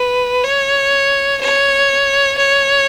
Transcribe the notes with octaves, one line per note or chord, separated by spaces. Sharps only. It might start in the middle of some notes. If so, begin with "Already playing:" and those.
Already playing: B4
C#5
C#5
C#5